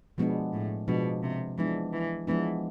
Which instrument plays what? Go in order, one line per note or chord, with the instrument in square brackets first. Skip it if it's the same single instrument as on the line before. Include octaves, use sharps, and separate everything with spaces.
[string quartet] B2 [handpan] F3 G#3 B3 D4
[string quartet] A2
[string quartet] B2 [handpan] F3 G#3 B3 D4
[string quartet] C3
[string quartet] E3 [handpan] F3 G#3 B3 D4
[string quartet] E3
[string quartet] E3 [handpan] F3 G#3 B3 D4